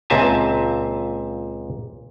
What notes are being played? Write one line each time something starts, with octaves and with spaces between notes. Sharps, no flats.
C#2 A#2 C4 E5 G#5 A5